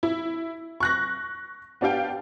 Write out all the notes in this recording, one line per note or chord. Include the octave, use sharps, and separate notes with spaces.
E4
C#6 F#6 A#6
B3 D4 G4 F5 G5